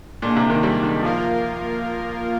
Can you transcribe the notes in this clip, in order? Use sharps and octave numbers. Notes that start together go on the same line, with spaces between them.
A#2 D3 G#3 D4
C3
D#3
G3
D#3
F3 A#3 F4 A#4